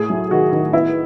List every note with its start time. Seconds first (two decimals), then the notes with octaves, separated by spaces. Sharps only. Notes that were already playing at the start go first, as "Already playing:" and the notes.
Already playing: A2 A3 G#4
0.10 F#3
0.31 D#3 F#4
0.52 D#3
0.73 B3 E4